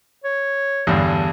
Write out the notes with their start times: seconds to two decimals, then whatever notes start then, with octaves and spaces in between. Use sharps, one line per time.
0.24 C#5
0.87 E2 G2 D3